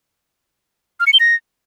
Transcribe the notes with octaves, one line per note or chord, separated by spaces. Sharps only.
F6
C#7
G7
A#6